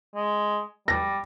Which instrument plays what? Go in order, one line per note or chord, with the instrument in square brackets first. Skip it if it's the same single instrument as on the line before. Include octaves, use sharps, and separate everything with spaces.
[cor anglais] G#3
[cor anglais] G3 [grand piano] A#6